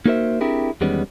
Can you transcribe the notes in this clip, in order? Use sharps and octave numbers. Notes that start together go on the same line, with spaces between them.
A#3 D#4 F#4 A#4 C5 E5
C4 D4 E4 G4 G#4 A#4
E2 D#3 G3 G#3 B3 C#4